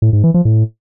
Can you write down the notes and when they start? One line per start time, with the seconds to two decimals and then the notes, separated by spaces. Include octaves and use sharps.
0.02 A2
0.13 G#2
0.24 E3
0.34 F3
0.45 A2